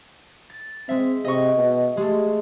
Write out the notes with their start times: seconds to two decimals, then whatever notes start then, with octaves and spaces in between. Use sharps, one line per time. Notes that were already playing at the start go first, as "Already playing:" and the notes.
0.50 A6
0.89 G#3 C4 E5
1.25 C3 D#5 C#6
1.56 B2
1.97 G#3 A3 G4